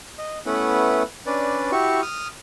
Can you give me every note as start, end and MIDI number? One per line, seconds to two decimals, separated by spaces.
0.18 0.39 75
0.46 1.03 57
0.46 1.03 59
0.46 1.03 61
0.46 1.03 64
0.46 1.03 71
0.46 1.03 78
1.26 1.71 61
1.26 1.71 62
1.26 1.71 71
1.26 1.71 74
1.72 2.01 64
1.72 2.01 66
1.72 2.01 67
1.72 2.01 85
2.02 2.28 87
2.02 2.28 89